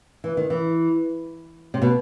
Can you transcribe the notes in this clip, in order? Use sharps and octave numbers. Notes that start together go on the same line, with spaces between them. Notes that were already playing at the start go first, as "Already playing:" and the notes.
E3
D#3
E3
C3
B2